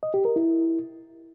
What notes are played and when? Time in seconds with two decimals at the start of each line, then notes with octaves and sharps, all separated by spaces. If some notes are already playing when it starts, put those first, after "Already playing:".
0.03 D#5
0.14 G4
0.25 A#4
0.36 E4